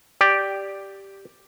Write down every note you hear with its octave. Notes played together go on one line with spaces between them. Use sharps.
G4 D5